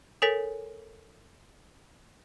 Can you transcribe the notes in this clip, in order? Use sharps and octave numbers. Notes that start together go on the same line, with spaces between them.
A4 A#4 C#5 G#5 A6 B6